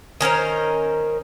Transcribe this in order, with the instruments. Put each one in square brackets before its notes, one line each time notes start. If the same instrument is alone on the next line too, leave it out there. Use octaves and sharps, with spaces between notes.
[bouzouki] D#3 C#4 A#4 C5